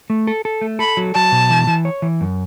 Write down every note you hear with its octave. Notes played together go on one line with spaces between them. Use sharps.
A3
A4
A4
A3
A4 B5
F#3
F#3 A5
B2
E3
E3
C#5
E3
F#2